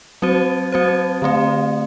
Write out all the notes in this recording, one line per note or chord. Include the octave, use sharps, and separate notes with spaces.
F#3 C4 F#4 C5
F#3 C4 F#4 C5
D3 A3 C4